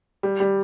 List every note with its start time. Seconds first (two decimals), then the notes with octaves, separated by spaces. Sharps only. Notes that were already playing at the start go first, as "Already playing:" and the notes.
0.23 G3
0.40 G3